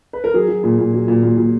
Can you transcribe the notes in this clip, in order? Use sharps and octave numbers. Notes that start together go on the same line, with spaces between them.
B4
A#4
F#3 G#4
F#3
A#2
A#2
F#3
A#2
A#2
A#2